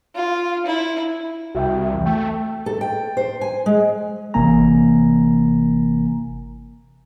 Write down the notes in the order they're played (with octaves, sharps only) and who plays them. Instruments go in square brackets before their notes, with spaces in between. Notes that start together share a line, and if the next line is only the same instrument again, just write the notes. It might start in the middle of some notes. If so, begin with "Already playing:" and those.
[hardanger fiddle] F4
E4
[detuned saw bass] C2 [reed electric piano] F#4 E5 G5
[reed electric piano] E2 E3
[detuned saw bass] A3 [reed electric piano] G5
[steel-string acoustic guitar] A4
G5
C5
G#5
G#3
[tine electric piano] G1 C3 E3 A#3 G#5 A#5